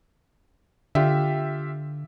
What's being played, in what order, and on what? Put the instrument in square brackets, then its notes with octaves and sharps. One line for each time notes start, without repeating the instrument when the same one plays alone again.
[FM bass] D3 [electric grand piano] F4 G4 E5